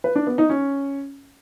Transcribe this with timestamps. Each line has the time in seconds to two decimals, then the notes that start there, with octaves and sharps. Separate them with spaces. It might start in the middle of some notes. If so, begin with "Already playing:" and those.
0.04 B4
0.15 D4
0.27 B3
0.38 D#4
0.49 C#4